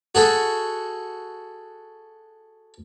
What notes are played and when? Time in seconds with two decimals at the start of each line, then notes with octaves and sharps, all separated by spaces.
0.15 F#4 G#4 A4